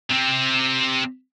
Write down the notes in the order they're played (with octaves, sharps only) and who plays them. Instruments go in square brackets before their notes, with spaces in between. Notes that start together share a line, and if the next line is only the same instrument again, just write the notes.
[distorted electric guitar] C3 C4